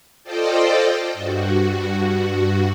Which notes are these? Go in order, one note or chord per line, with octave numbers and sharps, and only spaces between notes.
F4 A4 C5 D5 D#5 G5
G2 F#4